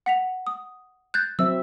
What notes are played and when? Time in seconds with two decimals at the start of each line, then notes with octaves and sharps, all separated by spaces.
0.06 F#5 B6 F7
0.47 D#6
1.14 F#6 G6 A6
1.39 F#3 C4 E5 E6